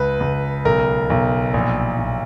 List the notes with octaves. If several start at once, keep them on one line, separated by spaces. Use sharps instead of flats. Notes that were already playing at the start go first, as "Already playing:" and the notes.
Already playing: C#2 B4
C#2
B1 A#4
B1
A#1
A#1